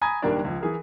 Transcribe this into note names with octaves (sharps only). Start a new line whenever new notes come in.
G#5 A#5 B5 D#6 G#6
F#1 D#3 G3 A#3 D4 D5
C#2 F3
E3 G#4 A#4